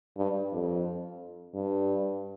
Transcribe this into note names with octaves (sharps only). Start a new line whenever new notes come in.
G2
F2
G2